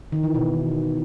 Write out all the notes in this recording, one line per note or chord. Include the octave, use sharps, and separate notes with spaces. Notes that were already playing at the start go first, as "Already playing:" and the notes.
D#3
E3
B2